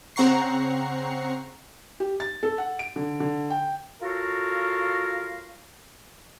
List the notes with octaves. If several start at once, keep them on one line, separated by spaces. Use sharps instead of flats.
C#3 C4 F#5 A#5 C#6 C7
G4
A6
A4
F#5
D7
D3
D3
G5
F4 F#4 A4 A#4 C#5 F5